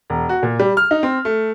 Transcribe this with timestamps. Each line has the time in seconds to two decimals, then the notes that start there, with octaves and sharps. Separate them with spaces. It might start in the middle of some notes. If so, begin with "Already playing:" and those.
0.10 E1
0.29 F#4
0.43 A#2
0.59 G3
0.77 F6
0.91 D#4
1.03 C4
1.25 A3